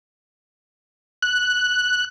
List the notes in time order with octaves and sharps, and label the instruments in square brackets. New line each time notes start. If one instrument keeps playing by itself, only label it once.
[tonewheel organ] F#6